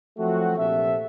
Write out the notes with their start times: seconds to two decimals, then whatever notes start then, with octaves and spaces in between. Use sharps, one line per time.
0.18 F3 F#3 A3 C4 F#4
0.57 A#1 C3 C4 A4 E5